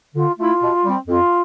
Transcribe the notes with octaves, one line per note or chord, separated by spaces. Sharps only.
D3 F4
A3 E4 F4
B2
G3 C4
F2 F4